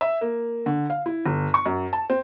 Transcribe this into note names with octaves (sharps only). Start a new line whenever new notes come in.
E5
A#3
D3
F5
E4
G1
C#6
F#2
A5
C4